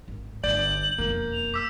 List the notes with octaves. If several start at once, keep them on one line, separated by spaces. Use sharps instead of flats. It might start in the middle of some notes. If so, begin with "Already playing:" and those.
G#1
G1 D5 G6 F#7
E1 F2 A#3
F7
D6 E6 B6 F7